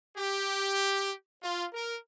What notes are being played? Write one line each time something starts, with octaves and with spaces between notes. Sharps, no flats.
G4
F4
A#4